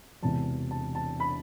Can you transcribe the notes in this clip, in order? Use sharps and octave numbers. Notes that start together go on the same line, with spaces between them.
E1 E2 C3 A5
A5
A5
B5